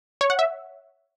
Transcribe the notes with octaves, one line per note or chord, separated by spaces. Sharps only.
C#5
F#5
E5